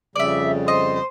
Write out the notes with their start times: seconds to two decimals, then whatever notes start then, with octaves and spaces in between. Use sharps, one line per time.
0.16 F2 C#3 G3 D5 E5
0.68 C5 D#5